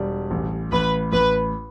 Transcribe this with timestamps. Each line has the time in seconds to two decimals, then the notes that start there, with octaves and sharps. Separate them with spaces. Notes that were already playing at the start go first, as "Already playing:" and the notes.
Already playing: E1 G3
0.31 A1
0.72 A1 B4
1.12 A1 B4